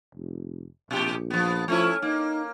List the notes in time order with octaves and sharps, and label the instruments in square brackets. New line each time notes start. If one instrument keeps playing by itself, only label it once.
[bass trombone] F1
[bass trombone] A#1 [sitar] B2 G4
[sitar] F3 B3
[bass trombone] F3 [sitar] A3 C#4 E4
[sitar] A#3 [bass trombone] D#4